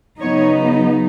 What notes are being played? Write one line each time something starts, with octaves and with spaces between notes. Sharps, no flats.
C#3 F#3 B3 D#4 C#5